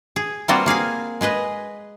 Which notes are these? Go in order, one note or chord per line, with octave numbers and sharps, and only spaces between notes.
G#4
G3 A#3 C4 F4 F#4
A#3 G#4 F5 G#5
G#3 G#4 B4 D#5